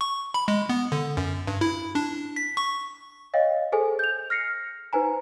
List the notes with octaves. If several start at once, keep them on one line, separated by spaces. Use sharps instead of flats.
C#6
B5
G#3
B3
D3
F#2
G2
E4
D4
B6
C#6
C#5 D#5 F5 G5
G#4 A4 C5 G#5
G6 F7
F6 A#6 C7 C#7
D#4 B4 C5 G#5 A#5